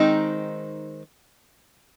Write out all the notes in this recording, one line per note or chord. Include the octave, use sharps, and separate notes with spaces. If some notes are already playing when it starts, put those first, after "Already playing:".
Already playing: D#3 G#3 C4 D#4